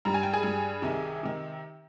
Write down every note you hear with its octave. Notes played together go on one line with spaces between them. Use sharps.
G2 G3 A#5
G#5
G5
G#4 G#5
G2 G3
C2 C3 D#3
C3 D#3